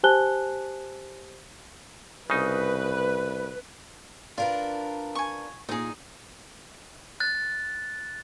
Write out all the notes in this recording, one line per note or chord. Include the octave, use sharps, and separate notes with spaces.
G4 C5 G#5 A5 F#6 G7
C2 C#3 D#4 B4
D4 F4 A#4 B4
G#5 C#6
D2 A#2 D#4 G#4
F#6 A6